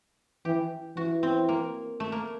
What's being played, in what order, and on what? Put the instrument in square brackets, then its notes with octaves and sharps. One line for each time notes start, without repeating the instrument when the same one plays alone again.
[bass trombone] E3 [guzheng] G4
[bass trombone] E3 [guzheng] F#4
[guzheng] C4
A#3
A3
A#3